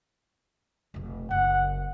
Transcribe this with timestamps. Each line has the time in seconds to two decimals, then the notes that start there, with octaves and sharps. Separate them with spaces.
0.94 F1 B1
1.31 F#1 F#5